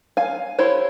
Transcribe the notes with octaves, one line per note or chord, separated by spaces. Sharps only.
F5 G#5
E4 G4 C5 C#5